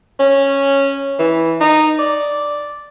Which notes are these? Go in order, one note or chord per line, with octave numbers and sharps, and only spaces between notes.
C#4
E3
D#4
D5